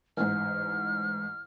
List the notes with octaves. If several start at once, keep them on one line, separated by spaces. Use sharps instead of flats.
A1 G#2 F6